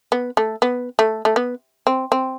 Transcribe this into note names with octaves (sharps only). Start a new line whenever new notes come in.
B3
A3
B3
A3
A3
B3
C4
C4